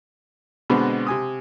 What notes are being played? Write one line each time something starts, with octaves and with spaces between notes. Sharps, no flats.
B2 D3 G#3 B3 C4
C3 G#5 D#6